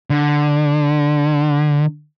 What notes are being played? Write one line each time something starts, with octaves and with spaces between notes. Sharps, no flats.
D3